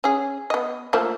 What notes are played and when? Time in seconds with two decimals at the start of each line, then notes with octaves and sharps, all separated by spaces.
0.04 C#4 G#4
0.50 B3 D#5
0.93 F3 A3 A#3